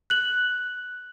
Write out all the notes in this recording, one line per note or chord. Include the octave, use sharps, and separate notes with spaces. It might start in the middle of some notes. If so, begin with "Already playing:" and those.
F#6 F#7